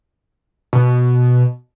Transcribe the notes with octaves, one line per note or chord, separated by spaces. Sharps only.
B2